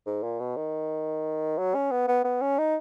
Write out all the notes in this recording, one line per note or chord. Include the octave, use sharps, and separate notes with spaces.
G#2
A#2
B2
D#3
F#3
C#4
B3
B3
B3
C#4
D#4